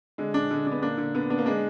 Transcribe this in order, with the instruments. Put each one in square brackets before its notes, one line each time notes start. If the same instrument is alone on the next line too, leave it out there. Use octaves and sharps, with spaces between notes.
[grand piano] D3 [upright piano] G#3
[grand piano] D4
[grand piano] D3 [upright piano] G#3
[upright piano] B3 [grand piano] D4
[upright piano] A#3 [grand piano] D4
[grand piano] D3
[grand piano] D3 [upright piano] B3
[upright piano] B3 [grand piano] D4
[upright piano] A#3
[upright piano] G#3 [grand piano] D4